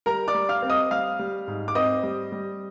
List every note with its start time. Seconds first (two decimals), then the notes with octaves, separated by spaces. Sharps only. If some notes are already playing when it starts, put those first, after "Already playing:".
0.06 G3 A#4 A#5
0.28 D5 D6
0.34 G3
0.49 F5 F6
0.62 C4
0.69 D#5 D#6
0.91 G3 F5 F6
1.19 G3
1.47 G#2
1.68 D6
1.75 C4 D#5 D#6
2.03 G3
2.32 G3